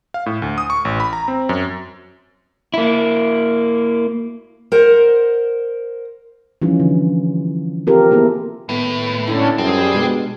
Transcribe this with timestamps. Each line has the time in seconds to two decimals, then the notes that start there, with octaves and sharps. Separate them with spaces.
0.14 F5
0.26 A2
0.42 D2
0.58 D#6
0.70 C#6
0.85 A1
1.00 B5
1.13 A#5
1.28 C4
1.49 F#2
2.74 A#3 E4
4.72 A#4 C5 F#5
6.62 E3 F3 G3 C#4 D#4 F4
6.80 D3
7.87 C4 F4 G4 A4 A#4
8.11 A#3 B3 E4 G#4 A4
8.69 A2 D#3 A3 B3
9.27 D3 C#4 D4 E4 A4
9.58 F#2 G3 C4 G#4
9.94 B2 G#3 D4